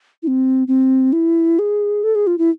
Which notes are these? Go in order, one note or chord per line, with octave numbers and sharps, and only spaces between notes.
E4
C4
C4
E4
G#4
A4
G#4
F4
E4